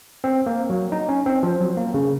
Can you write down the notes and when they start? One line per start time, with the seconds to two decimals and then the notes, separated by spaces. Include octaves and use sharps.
0.24 C4
0.46 A#3
0.70 F#3
0.92 D#4
1.09 C#4
1.26 C4
1.43 F3
1.60 F#3
1.77 A#3
1.94 C#3